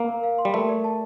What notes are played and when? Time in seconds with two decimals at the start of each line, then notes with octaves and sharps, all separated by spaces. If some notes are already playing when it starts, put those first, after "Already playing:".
Already playing: A#3
0.08 A#4
0.24 F5
0.38 C6
0.45 G3
0.54 A3 A#4
0.69 D5
0.84 A5